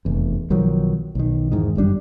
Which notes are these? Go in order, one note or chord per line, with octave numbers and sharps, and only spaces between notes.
F1 E2
B1 D#3 F3 F#3
B1 D#3
E2 G#2 D#3
G1 F#2 G3 D4